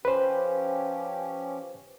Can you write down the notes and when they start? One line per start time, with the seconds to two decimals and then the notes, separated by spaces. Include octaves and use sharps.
0.05 F3 C#4 G4 B4 C5